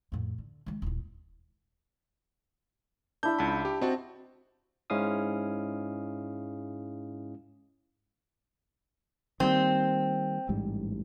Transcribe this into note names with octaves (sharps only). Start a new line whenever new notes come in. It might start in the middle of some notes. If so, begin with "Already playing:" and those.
F2 A2
D3
D#3 G#3
D#1 E4
D4 E4 E5 G6
C#2 A5 B5
G4
C4 F#4 D#5 A5
G#2 G#3 C#4 E4 F5 D#6
D#3 G3 A#3 C4
A1 G#2 G3